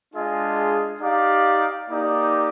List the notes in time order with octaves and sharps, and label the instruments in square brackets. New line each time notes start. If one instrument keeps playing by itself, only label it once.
[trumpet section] G#3 D4 F4 G#4 D#5
D#4 G4 D5 F5
A#3 D#4 G4 D5